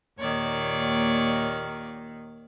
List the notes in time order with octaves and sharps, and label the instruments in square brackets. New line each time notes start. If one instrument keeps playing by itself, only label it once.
[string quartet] D#2 A#2 D#3 [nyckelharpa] C#5 D5